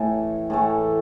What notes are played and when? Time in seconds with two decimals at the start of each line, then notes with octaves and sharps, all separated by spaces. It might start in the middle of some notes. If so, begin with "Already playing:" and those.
Already playing: A2 E3 A3
0.50 A2 E3 A3